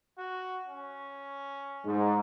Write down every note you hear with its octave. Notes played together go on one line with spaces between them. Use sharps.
F#4
C#4
G#2